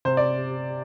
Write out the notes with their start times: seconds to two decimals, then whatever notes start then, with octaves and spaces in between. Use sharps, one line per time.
0.05 C3 C5
0.17 D5